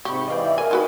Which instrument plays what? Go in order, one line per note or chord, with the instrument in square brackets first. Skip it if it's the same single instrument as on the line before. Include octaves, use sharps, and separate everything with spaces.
[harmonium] G#2 C3 [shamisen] G4 [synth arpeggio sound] B5 C#6
[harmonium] E3 D5 [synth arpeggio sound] D#5 F5 G5
[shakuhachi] E5
[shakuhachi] A#4 [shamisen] G#5
[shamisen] F3 F#4 B4 [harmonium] D#4